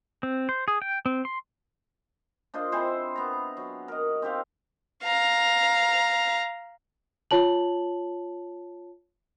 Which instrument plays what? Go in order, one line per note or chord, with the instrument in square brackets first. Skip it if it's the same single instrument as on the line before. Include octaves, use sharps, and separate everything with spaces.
[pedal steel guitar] C4
C5
G#4
G5
C4
C6
[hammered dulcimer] D4 F4 C5 D#5
C4 E4 G#4 C5
B3 A#5
F#3
A#4 D#5
C4 D#4 G4 F5
[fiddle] F5 A#5
[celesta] F4 C#5 A5 F#7